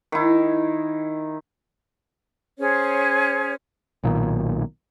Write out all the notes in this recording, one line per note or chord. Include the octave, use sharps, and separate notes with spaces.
D#3 E4
C#4 G#4 C5 C#5
B1 A#2 D#3